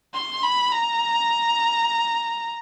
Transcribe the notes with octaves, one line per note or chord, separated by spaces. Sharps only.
C6
B5
A#5